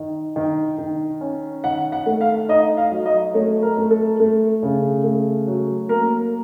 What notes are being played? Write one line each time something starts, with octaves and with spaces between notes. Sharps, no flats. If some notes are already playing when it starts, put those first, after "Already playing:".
Already playing: D#3
D#3
D#3
C#4
D#3 F#5
F#5
A3
F5
D#4 D#5
F5
F#3
D#5
A3 C#5
A#4
A3
A4
A3
C#3
A3
F#3
A#3 A#4